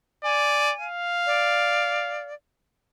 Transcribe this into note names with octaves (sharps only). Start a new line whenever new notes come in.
D5 G#5
F5
D5